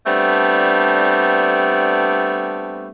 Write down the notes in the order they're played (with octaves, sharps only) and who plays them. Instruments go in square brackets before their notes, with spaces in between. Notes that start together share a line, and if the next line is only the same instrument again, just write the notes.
[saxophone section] G3 A3 B3 C4 D4